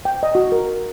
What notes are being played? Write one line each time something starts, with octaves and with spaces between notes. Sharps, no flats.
G5
D#5
F#4
A#4